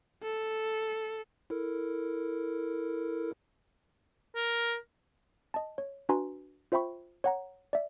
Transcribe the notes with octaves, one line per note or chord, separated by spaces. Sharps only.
A4
E4 A4 A#4
A#4
D#5 A5
C#5
D4 F#4 B4 G#5 A#5 C6
F4 C5 E5 G5 B5 C#6
C#5 F#5 A#5
D5 E5